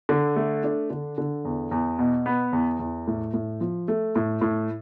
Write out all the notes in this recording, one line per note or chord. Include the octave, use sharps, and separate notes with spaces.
D3
A3
D4
D3
D3
E2
E2
B2
B3
E2
E2
A2
A2
F3
A3
A2
A2